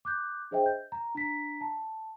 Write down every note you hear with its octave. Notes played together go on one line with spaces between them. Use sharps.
D6 F#6 G6
D4 G#4 C5 D#5 E5 G5
G6
A#5
D4 A#5 B6
A5